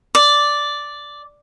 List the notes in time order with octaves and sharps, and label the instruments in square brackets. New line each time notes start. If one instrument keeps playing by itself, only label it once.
[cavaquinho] D5